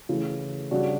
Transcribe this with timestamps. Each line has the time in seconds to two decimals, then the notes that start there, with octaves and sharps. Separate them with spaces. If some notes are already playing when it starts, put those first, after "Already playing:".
0.09 C#3 E3 A3
0.71 C#3 G3 D4 F#4